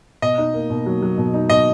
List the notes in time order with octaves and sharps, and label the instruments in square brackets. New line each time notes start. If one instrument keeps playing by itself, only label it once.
[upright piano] B2 [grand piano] D#5
[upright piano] D#4
A#3
B2
F#3
F#3
B2
D#4
[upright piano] B2 [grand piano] D#5